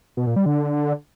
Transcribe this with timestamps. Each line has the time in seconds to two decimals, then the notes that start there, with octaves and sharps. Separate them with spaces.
0.17 B2
0.27 A#2
0.36 G3
0.46 D3